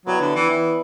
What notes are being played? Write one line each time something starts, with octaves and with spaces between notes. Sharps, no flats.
F#3 B3 E4 G4 D5
D3
E3
E3